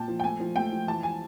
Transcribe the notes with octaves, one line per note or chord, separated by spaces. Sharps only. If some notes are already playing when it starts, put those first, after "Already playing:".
Already playing: A#2 G5 A5
F3
G5
A3 G#5
F3
A3 G5
F3
E3 A5
G#5